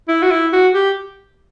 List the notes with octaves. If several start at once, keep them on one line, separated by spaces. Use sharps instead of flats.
E4
F#4
E4
F#4
G4